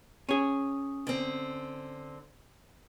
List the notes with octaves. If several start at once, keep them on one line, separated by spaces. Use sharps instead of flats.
C#4 G#4
D3 C4